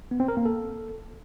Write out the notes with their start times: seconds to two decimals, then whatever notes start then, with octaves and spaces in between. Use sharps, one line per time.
0.11 B3
0.20 C4
0.28 A#4
0.37 A#3
0.45 A4